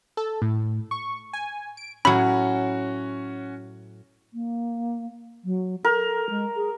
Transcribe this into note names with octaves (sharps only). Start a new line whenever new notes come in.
A4
A2
C#6
G#5
D7
A2 F#3 C#4 F#4 B5
A#3
F#3
A4 A#4
G#3
G#4